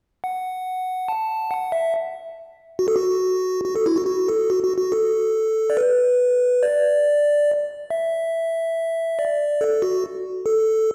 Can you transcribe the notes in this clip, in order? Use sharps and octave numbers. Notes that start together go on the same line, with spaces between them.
F#5
A5
F#5
E5
F#4
A4
F#4
F#4
A4
E4
F#4
F#4
A4
F#4
F#4
F#4
A4
D5
B4
D5
E5
D5
A4
F#4
A4